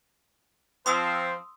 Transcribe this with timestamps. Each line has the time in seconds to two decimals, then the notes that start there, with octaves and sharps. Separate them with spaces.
0.86 F3 C4 C5 C6 D#6 E6